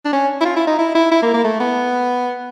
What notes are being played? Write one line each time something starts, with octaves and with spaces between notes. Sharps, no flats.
D4
C#4
E4
F4
E4
D#4
E4
E4
E4
A#3
A#3
A3
B3